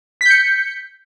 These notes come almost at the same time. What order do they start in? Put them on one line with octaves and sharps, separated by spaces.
B6 G6 C#7